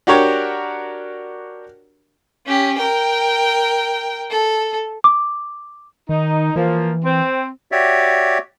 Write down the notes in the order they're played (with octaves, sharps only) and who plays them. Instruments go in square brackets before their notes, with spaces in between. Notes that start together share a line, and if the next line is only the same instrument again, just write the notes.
[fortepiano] D4 F#4 G4 A#4 C#5
[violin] C#4 G4
A#4 G5
A4
[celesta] D6
[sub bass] D#3 [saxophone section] D#4
[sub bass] E3 [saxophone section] F3 A#3
[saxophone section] C4
[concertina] F#4 G4 C#5 D5 E5